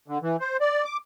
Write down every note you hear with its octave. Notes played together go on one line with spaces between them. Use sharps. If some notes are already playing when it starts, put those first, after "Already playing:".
D3
E3
C5
D5
D6